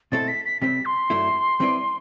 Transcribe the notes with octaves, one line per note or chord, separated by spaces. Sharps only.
B2 A3 C4 E4 A4 A6
B6
B6
C3 G3 C4 B6
C6
G2 F#3 A3 E4
G3 C4 E4 B4 D5